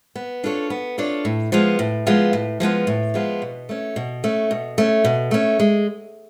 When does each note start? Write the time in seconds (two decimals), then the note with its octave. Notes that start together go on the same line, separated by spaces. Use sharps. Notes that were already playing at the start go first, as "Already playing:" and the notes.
0.16 B3
0.44 D4 F4 A4 C#5
0.70 B3
0.98 D4 F4 A4 C#5
1.25 A2
1.52 F3 G#3 B3 F4
1.79 A2
2.07 F3 G#3 B3 F4
2.33 A2
2.60 F3 G#3 B3 F4
2.87 A2
3.14 F3 G#3 B3 F4
3.42 B2
3.69 A3 C#4
3.96 B2
4.24 A3 C#4
4.51 B2
4.78 A3 C#4
5.05 B2
5.31 A3 C#4
5.60 G#3